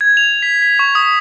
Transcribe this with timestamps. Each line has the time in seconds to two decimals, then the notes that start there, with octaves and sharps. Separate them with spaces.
0.01 G#6
0.17 F7
0.42 B6
0.62 B6
0.79 C#6
0.95 D#6